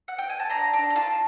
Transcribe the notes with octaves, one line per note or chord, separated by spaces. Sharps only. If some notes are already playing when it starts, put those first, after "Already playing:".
F#5
G5
G#5
A5
D4 A#5
D4
A#5
F4 A5